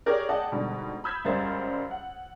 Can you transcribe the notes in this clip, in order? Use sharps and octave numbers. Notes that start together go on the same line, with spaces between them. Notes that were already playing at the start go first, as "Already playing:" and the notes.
G4 G#4 A#4 C#5 D5
G#4 D5 D#5 F#5 G5 A5
G#2 B2 D3 G3
B5 D#6 E6 G6 G#6 B6
C#2 F#2 G3 A#4 C5 A6
F#5